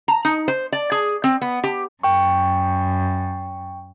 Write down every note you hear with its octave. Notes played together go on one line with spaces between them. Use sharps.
A#5
D#4
C5
D5
G#4
C4
B3
G4
F#2 G5 C#6